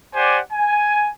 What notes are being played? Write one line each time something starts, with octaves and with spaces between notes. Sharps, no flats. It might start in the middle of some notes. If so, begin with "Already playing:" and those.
G4 C5 D5 F#5 G#5
G#5